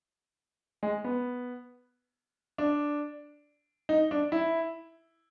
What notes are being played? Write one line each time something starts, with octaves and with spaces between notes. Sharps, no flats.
G#3
B3
D4
D#4
D4
E4